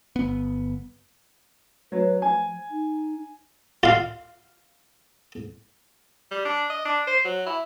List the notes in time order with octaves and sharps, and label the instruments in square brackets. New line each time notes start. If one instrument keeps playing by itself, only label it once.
[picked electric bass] G1 B3
[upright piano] F#3 [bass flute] B4
[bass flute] F3 [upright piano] G#5
[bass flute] D#4
[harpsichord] F4 F5
[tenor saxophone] G3
D4
D#5
D4
C5
F#3
E4